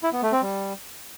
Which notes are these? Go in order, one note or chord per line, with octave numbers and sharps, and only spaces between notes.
E4
B3
A3
C4
G3